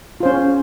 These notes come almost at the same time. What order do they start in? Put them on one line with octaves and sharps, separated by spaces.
F4 C5 C#4